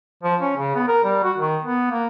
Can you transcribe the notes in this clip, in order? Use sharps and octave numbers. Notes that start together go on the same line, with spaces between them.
F3
C#4
C#3
B3
A#4
G3
F#4
D#3
B3
A#3